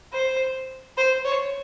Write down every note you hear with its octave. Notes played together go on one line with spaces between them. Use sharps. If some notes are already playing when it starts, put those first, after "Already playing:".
C5
C5
C#5